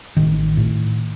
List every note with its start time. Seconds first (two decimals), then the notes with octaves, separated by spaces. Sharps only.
0.17 A1 D#3
0.57 A2